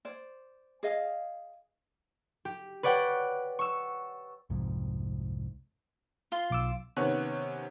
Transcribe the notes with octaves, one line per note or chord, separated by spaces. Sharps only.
C5 D5
G#4 D#5 F5
G4
B4 C#5 D5 F#5 G5
C#6 E6
C2 F2 G#2
F4 C6
B1 D6 E6
C3 D#3 B3 C#4 C#5 F#6